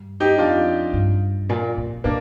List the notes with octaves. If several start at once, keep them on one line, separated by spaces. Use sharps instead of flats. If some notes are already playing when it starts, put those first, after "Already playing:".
Already playing: G2
D#4 G4
F2 D4 F4
G2
A#2
A#2
A#2 A#3 D4